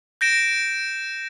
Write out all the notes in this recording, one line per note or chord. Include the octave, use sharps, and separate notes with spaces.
G6 A#6 D7 E7